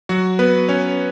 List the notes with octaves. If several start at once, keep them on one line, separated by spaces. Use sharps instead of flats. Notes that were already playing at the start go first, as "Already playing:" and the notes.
F#3 F#4
B3 B4
C#4 C#5